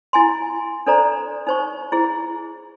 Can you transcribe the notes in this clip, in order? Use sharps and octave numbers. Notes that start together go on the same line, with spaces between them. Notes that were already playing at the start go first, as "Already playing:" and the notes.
E4 G#5 C6
D4 A4 C5 D5 A#5
D#4 C5 C#6
E4 G#4 C5